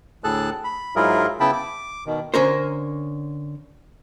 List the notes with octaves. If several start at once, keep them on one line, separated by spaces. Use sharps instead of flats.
D2 A2 G#4 A4 A5 F#6
B5
G#2 F#3 E4 F4 G#4 A#4
C#3 B3 E4 G5 A5 B5
D6
B2 D#3
D3 C#4 A#4 C5